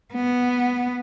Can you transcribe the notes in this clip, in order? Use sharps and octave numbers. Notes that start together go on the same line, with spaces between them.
B3